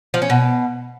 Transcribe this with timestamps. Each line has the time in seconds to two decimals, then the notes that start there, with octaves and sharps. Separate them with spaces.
0.14 F3
0.22 C#4
0.30 B2